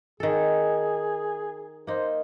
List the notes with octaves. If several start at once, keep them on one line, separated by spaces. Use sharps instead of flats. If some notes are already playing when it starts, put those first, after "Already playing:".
D#3 G#4 A4
A#3 D#4 C5